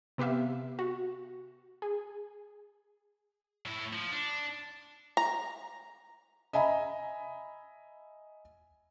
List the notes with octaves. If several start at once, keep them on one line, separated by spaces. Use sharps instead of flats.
C3 B3 G4 E5 F5
F#4
G#4
A2 E4
F3
D4
A#5
D#5 E5 G#5 A#5 B5